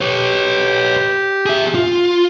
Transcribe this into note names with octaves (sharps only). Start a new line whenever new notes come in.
G4 B4 C#5
G#4 E5
F4